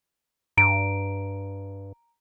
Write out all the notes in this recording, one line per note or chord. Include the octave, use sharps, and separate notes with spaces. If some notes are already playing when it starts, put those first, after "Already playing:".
G2 A#5 D7